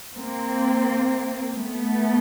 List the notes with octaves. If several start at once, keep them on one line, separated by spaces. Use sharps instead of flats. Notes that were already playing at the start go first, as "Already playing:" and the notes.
A#3 C4
A3 B3